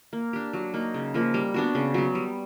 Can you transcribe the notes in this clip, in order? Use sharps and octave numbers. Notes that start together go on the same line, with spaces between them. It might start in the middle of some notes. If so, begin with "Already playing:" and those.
A#3
D4 G4
F#3
A#3 D#4
C#3
F3 A#3
G3
B3 D4 F#4
C#3
F#3 B3
G3